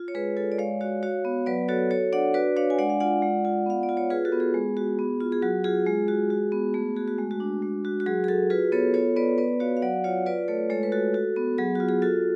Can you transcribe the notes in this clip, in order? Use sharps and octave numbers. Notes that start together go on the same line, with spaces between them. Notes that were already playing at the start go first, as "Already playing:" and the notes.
Already playing: F4
C#5
G#3 G#4 B4
F4 A4 C#5
D5
G#3 C#5 F5
F#4 C#5 F5
F#4 C#5 F5
B3
F#3 B4 D5
F#4 A4 C#5
F#4 A4 C#5
D4 D5 F#5
F#4 B4 D5
D4 C#5 F5
G#5
G#3 D5 F#5
F5
F4 D5 F#5
G#3
F4
B3 F5
D5
F4
C#5
F4 G#4 B4
F#4 A4
B3
G#4
G#3
F#4
B3
F4
G#4
F#3 F#4
F4 G#4
G#3
F#4
F#4
B3
A3 G#4
F#4 G#4
F#4
G#3
F#4
D4
G#3
F#4
F#4
F#3 G#4
G#4
F#4 A4
F4 G#4 B4
B3 A4 C#5
F4 A4 C#5
B3 B4 D5
B3 B4 D5
F#4 C#5 F5
F5
F#3 D5 F#5
F4 C#5 F5
F4 B4 D5
A3 A4 C#5
G#3 A4 C#5
B4
F#4 A4
F#4
B3
F#3 G#4
F4 F#4
G#4
F4 F#4 A4